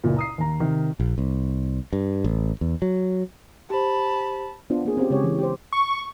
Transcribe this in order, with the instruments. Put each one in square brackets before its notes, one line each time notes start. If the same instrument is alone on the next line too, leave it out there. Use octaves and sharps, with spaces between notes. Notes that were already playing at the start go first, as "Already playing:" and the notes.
[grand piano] F#1 C#2 A#2
A#5 D#6 C7
D#2 A#5
C3 D#3
[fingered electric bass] A#1
C2
G2
A1
E2
F#3
[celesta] G4 C5 [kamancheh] A5 B5
[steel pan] B3 D4 F4 C5
A#3 G#4
C4 C#4 G4
C#3 G#3 C4 G4 G#4 C#5
E3 C#4
G4 C5
[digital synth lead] C#6